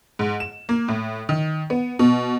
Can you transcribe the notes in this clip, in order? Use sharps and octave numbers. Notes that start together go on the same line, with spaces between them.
G#2
E7
A#3
A2
D#3
B3
B2